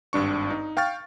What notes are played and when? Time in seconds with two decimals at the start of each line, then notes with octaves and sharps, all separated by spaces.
0.13 G#1 G2 D4 C#6
0.50 D#4
0.77 F5 G5 C#6 F6 A6